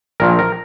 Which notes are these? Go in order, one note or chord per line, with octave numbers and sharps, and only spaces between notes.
A#1 A#2 F3 A#4
A#4